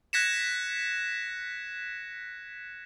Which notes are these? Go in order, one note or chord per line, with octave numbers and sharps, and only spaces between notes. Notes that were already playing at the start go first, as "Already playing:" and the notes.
F#6 G#6 A#6 B6 C#7 E7